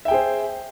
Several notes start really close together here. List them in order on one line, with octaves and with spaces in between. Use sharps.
E5 G5 G#4 C5